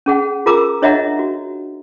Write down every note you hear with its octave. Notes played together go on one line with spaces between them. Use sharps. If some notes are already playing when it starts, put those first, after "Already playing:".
C#4 G#4 F#5
F4 G#4 A#4 A#5 D6 E6
D4 C#5 D#5 E5 F#5 A#5
F#4